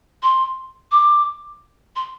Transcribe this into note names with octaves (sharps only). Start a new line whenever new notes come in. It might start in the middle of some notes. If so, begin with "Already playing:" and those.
C6
D6
C6